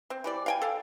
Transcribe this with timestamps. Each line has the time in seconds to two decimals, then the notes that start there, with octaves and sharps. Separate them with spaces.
0.10 C4
0.24 E3 G4 D5
0.46 F5 G5 G#5
0.62 A4 F5